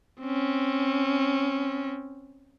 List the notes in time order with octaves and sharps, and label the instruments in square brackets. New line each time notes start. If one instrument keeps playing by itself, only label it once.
[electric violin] C4 C#4